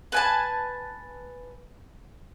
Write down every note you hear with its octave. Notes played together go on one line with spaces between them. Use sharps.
B4 G#5 A5